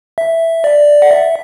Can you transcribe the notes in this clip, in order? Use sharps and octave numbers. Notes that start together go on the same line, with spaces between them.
E5
D5
F#5
E5